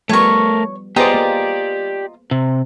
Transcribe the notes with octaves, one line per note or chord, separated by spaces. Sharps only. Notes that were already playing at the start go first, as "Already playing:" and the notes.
F3 G3 A3 B3 A#4 C#5 C#6
B3 F4 G4 G#4 C5 D5 D#5 A#5
A#3
C3